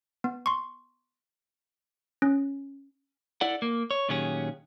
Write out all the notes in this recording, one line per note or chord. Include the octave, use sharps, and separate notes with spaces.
B3
C6 C#6
C#4
E4 A4 D5 F#5
A#3
C#5
A#2 D#3 F#3 C#4 G4 G#4